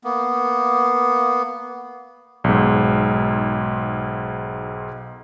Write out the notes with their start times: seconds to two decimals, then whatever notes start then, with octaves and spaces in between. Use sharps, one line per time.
0.04 A#3 B3
2.44 B1 G#2